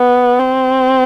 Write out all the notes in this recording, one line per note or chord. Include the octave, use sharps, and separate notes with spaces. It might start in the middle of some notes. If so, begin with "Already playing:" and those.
Already playing: B3
C4